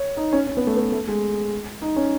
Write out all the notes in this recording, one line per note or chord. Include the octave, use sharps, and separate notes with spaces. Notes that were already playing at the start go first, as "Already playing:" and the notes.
Already playing: C#5
D#4
C#4
C#4
B3
A3
B3
A3
G#3
D#4
C#4